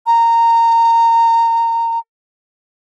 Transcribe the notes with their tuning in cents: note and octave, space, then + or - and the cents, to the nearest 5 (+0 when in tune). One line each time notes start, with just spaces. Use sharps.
A#5 -20